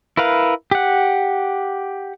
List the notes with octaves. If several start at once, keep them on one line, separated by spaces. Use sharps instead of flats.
E4 A#4 B4 F5
G4 F#5